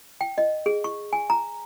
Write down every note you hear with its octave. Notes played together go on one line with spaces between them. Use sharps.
G5
D#5
G#4
C#6
G#5
A#5